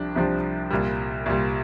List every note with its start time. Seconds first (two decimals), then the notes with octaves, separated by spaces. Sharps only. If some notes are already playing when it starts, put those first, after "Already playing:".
Already playing: C2 C3 F3 D4 G4
0.15 C2 C3 F3 D4 G4
0.70 C2 A#2 G3
1.26 C2 A#2 G3